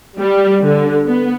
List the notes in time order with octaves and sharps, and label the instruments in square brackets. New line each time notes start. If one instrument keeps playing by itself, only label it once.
[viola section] G3
D3
B3